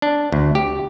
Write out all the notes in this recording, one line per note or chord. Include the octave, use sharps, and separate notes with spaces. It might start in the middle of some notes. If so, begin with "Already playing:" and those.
D4
D2
G4